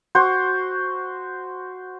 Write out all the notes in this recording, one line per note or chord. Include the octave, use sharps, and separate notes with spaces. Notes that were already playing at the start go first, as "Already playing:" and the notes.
F#4 C5